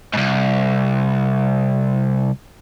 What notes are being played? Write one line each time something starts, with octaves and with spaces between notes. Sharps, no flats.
C2 G#2